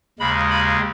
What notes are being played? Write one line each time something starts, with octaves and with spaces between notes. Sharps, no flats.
D#2 C#3 G#3 B5
B5